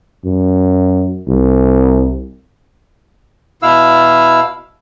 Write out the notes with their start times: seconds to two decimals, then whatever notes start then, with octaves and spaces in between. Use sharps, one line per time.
0.24 F#2
1.28 C2
3.62 B2 E4 F5 E6